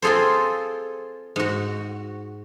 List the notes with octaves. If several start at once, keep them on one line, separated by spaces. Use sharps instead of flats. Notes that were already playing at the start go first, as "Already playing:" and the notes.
C4 F4 G#4 A4 C5
G#2 F#4